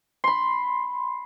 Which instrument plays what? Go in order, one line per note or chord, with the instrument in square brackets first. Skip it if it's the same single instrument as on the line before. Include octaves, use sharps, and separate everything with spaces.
[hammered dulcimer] B5 C6